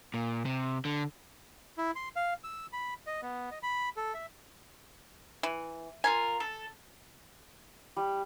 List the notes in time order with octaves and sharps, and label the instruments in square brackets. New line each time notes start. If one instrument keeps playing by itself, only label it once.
[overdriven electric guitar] A#2
C3
D3
[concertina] E4
C6
F5
E6
B5
D#5
B3
D#5
B5
A4
E5
[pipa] E3
[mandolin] F4 G#4 A#4 [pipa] G#5
[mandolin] A4
[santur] G3